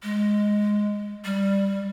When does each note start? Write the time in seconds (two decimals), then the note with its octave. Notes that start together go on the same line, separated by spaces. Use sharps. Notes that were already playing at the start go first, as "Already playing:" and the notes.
0.03 G#3
1.25 G3